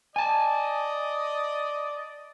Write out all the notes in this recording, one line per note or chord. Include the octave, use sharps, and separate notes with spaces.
D5 D#5 G#5 A5